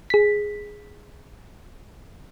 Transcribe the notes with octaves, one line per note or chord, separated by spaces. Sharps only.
G#4 B6